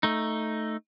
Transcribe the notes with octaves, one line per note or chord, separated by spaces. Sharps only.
A3 D#4